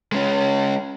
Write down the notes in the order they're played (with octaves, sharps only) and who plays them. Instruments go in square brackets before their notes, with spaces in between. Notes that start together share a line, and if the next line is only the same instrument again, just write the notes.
[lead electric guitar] G#3 C#4